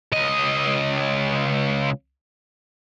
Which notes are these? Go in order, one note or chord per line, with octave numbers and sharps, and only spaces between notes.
C#2 D#5